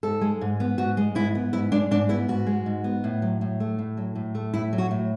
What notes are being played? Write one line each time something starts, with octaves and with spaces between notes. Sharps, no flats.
G#2 A4
G#3
G#2
B3
G#2 F#4
G#3
G#2 E4
B3
G#2 E4
G#3 D4
G#2 D4
B3 E4
G#2 F#4
G#3
G#2
B3
A2
F#3
A2
A3
A2
F#3
A2
A3
A2 E4
F#3
F#4
A2